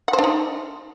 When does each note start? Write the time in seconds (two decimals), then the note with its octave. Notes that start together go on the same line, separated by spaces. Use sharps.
0.08 F#5
0.13 C5
0.19 D4
0.24 D#4